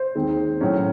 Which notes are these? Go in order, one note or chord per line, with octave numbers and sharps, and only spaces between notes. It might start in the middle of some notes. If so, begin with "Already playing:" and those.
Already playing: C5
D#2 D#3 G#3 C4
A2 F#3 C#4